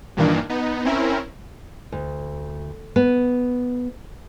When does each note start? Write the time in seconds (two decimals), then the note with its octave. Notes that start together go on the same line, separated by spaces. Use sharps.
0.17 G2 A#2 D#3 E3 A#3 D4
0.49 B3 D#4
0.85 C4 C#4 E4 A#4
1.92 D2
2.96 B3